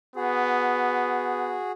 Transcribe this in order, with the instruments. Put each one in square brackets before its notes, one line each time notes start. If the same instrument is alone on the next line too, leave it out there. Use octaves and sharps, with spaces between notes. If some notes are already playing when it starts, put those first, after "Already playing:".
[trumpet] B3 [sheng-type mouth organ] F#4 G#4